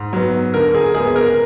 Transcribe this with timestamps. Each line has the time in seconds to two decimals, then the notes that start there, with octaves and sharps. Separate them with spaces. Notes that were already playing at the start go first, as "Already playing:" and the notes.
Already playing: G#2
0.13 F#3 B3
0.54 D3 A#4
0.75 G#4
0.94 G#3 B3 G#4
1.16 A#4